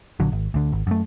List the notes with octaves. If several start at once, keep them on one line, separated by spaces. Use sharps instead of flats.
A#1 D3 F#3
G#1
D2 D3
G#1
F#2 A3